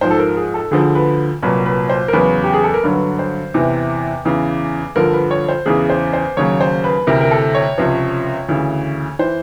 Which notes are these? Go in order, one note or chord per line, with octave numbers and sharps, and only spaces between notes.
G#2 F3 C5
A4
A#4
G#4
A4
D2 D3 F3 G#4
B4
C2 A#2 F#3 B4
B4
C5
A#4
E2 C#3 F#3 B4
G4
G#4
A4
A#4
G2 D3 F#3 B4
C5
E2 C3 E3
E2 C#3 E3
G2 D3 F3 A#4
B4
C#5
C5
E2 C#3 E3 G#4
C5
C5
D#2 C#3 F#3 C#5
C5
B4
D2 C3 E3 A#4
A#4
A4
C#5
C#2 C3 F3
D2 C#3 E3
E3 C5